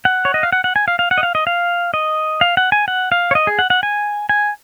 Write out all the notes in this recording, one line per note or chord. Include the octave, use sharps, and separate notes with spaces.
F#5
C#5
D#5
F5
F#5
F#5
G#5
F5
F5
F#5
D#5
F5
D#5
F5
D#5
F5
F#5
G#5
F#5
F5
C#5
D#5
G#4
F#5
F#5
G#5
G#5